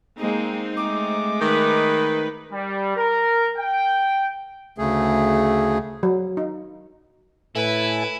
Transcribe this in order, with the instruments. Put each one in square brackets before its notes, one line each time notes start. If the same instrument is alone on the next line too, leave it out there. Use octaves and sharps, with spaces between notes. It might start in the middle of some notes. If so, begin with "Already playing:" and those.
[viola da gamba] G#3 A#3 [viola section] C4 D#4
[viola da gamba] G#3 A3 [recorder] D6
[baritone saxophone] D#3 [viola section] D#4 B4
[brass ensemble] G3
A#4
G5
[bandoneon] D2 C#3 A3 G#4
[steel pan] F#3
D#4
[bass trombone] A2 [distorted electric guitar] E4 [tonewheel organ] A4 E5 G#5 [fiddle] B4